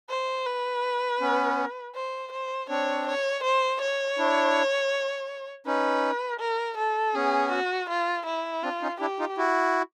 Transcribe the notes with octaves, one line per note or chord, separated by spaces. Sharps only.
C5
B4
B3 C#4
C5
C5
C4 D4 C#5
C#5
C5
C#5
D4 E4
C#4 D#4 B4
A#4
A4
B3 C#4 G#4
F#4
F4
E4
C4 D4 F4
C#4 D#4
D4 E4 G4
D#4 F4
E4 F#4